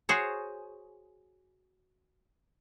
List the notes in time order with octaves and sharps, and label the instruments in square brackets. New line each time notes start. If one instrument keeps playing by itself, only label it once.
[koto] F#4 G#4 C5 C#5